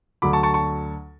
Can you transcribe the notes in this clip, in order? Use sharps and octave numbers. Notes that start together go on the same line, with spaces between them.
D2 D3 F#3 B5 D6
A5 C#6
A5 C#6
A5 C#6